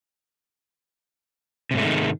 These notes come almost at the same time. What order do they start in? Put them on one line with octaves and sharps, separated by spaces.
C3 G#2 A3 G#3 D#3